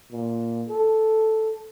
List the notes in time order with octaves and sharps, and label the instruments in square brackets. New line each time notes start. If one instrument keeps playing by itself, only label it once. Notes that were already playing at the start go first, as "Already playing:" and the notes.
[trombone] A#2
A4